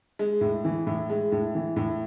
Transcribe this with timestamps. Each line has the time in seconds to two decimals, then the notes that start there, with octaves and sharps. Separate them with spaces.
0.19 G#3
0.41 A2
0.65 E3
0.87 A2
1.10 G#3
1.32 A2
1.55 E3
1.76 A2